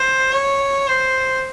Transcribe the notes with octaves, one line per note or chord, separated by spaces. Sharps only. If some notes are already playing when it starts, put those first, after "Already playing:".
Already playing: C5
C#5
C5